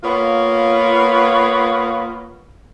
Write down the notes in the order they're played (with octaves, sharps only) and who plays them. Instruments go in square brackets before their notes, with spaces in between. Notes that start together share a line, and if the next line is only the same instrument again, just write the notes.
[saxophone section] A#3 B3 F4 C#5